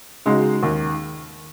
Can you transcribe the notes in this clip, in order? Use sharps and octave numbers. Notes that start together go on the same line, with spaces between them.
C#3 G#3 D#4 F#4
D#2